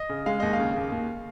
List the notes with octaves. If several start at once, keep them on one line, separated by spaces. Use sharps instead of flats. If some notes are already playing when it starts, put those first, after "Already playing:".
Already playing: D#5
C#3
G#3 F5
D#2 D#5
F5
C#3
D#2
D#2